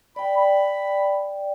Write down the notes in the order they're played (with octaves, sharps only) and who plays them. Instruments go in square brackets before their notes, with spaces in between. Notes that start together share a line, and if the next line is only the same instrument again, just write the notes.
[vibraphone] D5 G5 [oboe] B5
[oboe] B5